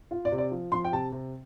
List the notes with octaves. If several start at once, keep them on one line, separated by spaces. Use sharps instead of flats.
F4
D5
C3
D5
F3
F3 C6
G5
C3 A5
C3